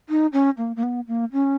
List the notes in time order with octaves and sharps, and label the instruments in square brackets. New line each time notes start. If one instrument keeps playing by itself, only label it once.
[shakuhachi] D#4
C#4
A#3
A#3
B3
A#3
C#4